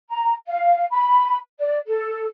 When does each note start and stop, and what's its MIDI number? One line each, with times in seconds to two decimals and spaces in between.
0.10 0.33 82
0.46 0.85 77
0.91 1.36 83
1.59 1.77 74
1.87 2.25 69